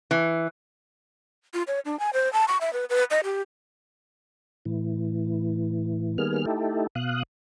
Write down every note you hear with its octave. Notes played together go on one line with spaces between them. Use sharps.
E3
F4
C#5
D4
G#5
C5
A5
C#6
E5
B4
B4
D#5
G4
A2 E3
D#3 G3 A#3 B3 G#4 F6
A3 D#4 E4 G4 A4
B2 F5 D#6 F#6